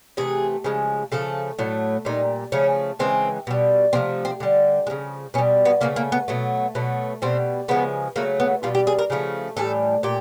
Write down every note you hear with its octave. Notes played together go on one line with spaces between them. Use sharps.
C3 E3 A3 G#4
C#3 F3 G#3
C#3 F3 A3 A4
A2 F#3 A3
A#2 G3 D#4
C#3 F3 A3 C#4
C#3 E3 G#3 C4
B2 G3
C3 F3 A3 C4
C4
D3 G3
G#3
C#3 F3
B2 G3 C#4
B3
C#3 F#3 A3 A#3
A#3
B3
B2 F#3 A3
B2 F#3 A3
B2 G3 C4
C#3 F3 G#3 B3
C#3 F#3 A3 A#3
B3
B2 G3 F4
G4
G#4
A#4
C#3 F3 A3
A2 E3 G3 A4
A#2 G4